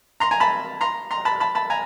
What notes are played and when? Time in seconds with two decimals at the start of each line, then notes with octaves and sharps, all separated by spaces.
0.20 A#5 C6
0.31 G#5 A#5
0.40 A5 B5
0.81 A#5 C6
1.11 A#5 C6
1.25 A5 B5
1.40 A5 B5
1.55 A5 B5
1.70 G#5 A#5